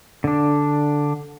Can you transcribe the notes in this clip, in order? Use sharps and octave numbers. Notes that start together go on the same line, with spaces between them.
D3 D4